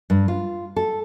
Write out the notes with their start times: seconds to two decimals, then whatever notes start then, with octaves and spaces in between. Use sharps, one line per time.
0.10 G2
0.28 F4
0.76 A4